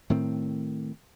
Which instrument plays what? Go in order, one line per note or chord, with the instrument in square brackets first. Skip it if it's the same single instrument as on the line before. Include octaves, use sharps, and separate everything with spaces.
[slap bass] A2 D#3 C4